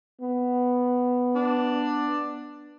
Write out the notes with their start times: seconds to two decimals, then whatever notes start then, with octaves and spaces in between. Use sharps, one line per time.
0.21 B3
1.35 D4